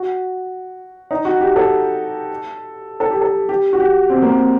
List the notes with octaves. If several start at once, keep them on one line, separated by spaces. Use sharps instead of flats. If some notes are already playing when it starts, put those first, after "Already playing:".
Already playing: F#4
D#4
F#4
G4
A4
A4
G4
A4
G4
F#4
G4
C4
A#3
C4